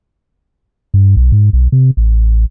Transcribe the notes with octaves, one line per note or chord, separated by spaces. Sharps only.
G2
B1
G#2
B1
C3
A1